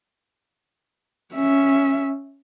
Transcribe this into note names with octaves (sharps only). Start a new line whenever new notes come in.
C#4 E5